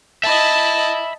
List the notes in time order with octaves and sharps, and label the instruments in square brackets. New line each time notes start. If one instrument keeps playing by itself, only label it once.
[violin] D#5 A5 [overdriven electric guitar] E5 B5